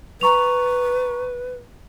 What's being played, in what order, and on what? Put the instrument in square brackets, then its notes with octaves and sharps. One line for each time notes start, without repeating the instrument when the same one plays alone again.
[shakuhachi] B4 [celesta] A#5 C#6 F7